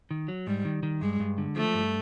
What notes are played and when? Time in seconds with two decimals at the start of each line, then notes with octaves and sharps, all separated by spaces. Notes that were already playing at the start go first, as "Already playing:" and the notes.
0.11 D#3
0.28 F#3
0.47 G#2 G3
0.65 D#3
0.83 D#3
1.01 G2 G#3
1.20 G2
1.38 D3
1.56 F3 A3
1.74 G2